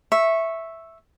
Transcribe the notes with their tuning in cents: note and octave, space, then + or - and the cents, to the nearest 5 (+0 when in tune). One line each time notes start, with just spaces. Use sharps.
E5 +0 C#6 -15